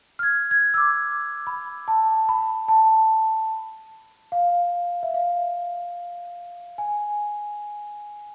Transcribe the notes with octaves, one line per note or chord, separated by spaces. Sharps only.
F6
G#6
G#6
E6
D6
B5
A5
B5
A5
F5
E5
F5
G#5